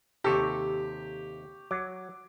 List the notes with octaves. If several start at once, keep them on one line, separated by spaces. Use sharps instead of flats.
D#2 C3 G4 A4 C#6
F#3 D6